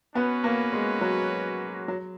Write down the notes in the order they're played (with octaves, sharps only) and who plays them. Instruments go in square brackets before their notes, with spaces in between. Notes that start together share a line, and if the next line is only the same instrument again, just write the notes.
[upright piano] B3 [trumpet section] C#4 F#4 B4
[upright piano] A#3
G#3
F#3
F#3